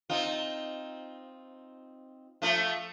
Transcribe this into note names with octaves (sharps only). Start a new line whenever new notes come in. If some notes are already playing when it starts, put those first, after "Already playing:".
C4 D#4 F4
F3 A3 F4